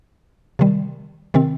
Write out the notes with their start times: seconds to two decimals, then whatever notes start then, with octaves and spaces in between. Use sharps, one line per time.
0.59 C3 D#3 G3
1.34 C3 D#3 C4